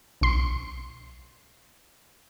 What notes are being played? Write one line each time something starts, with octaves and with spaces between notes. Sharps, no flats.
B1 C6